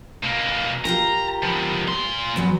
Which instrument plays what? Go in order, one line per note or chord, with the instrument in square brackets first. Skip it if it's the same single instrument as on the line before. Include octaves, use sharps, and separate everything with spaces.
[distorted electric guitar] B2 A#3
[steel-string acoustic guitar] F4 G4 A#4 [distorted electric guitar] A#5
[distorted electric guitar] F3 B3
A#2 C6
[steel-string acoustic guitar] E2 F#3 B4